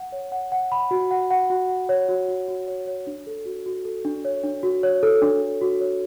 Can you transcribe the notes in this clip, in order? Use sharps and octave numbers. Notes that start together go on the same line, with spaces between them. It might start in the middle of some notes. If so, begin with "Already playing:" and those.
Already playing: F#5
C#5
F#5
F#5
B5
F#4
F#5
F#5
F#4
F#5
C#5
F#4
F#4
F#4
C#5
C#5
D4
A4
F#4
F#4
A4
D4
C#5
D4
F#4
C#5
A4
D4
A4
F#4
C#5